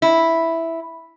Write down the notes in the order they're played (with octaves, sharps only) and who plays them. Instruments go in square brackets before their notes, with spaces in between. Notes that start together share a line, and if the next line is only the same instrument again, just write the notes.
[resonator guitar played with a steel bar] E4